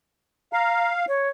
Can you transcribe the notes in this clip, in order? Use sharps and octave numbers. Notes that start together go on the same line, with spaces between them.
F5 A#5
C#5